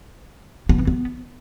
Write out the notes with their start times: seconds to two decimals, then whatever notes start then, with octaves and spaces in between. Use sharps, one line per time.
0.69 B3
0.78 E3
0.87 B3